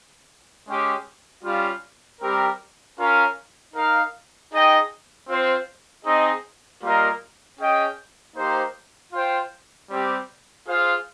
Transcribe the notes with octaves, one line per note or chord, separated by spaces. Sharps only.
G#3 C#4 G4
G3 C#4 F4
G3 C4 G4 A#4
C#4 F4 A#4 F5
D#4 A#4 F5
D#4 G#4 D#5 G5
C4 F4 C5
C4 D#4 G#4 D#5
G3 A#3 F4 A#4 D#5
C#4 G#4 D#5 G5
A#3 D#4 G4 C5
F4 C5 G5
G3 C4 G4
F4 G#4 C5 F5